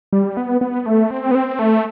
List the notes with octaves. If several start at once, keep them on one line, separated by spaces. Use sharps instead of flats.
G3
B3
B3
A3
C4
B3
C4
A3